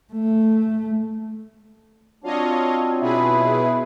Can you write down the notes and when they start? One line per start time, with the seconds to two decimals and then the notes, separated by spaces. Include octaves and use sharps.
0.13 A3
2.24 F#3 C4 D4 F4 C#5 D#5 F5
3.01 B2 E4 G#4 B4 E5